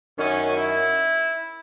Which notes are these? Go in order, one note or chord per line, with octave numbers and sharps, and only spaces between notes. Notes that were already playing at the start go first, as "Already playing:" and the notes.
F#2 D#3 F#3 C#4
E4